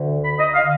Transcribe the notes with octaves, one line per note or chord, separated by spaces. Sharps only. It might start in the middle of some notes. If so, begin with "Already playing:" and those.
Already playing: D2 D3
B5
D#5
F5
D3